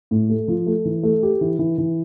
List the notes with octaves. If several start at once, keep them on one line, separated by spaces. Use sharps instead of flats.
A2
A3
F3
A3
E3
A3
G4
E3
E3
E3